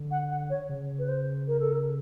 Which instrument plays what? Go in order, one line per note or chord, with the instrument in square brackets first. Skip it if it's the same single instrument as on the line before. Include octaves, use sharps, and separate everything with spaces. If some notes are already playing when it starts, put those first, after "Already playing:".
Already playing: [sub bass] D3
[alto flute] F#5
F#5
C#5
[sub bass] C#3
[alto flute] B4
C5
A#4
A4
A#4